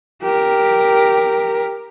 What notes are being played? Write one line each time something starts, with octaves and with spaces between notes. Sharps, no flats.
G4 A#4